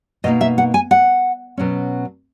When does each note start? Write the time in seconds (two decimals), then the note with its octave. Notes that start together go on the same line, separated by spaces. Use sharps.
0.24 B2 A#3 D#4 D#5
0.41 E5
0.58 F#5
0.74 G#5
0.91 F#5
1.57 B2 F#3 C#4